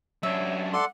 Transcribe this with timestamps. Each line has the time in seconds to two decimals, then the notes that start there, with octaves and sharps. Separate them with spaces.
0.23 F#2 D4 C#5 E5
0.73 A4 D5 F#5 C6